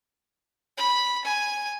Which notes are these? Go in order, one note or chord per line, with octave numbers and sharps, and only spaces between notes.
B5
G#5